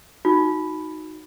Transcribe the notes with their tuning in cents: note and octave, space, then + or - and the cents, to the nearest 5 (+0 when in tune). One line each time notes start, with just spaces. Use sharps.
D#4 +0 F#4 -15